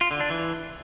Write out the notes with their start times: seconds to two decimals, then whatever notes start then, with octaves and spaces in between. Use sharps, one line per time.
0.01 F4
0.11 D3
0.20 D4
0.30 E3